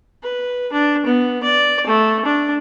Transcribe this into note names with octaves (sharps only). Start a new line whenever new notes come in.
B4
D4
B3
D5
A3
D4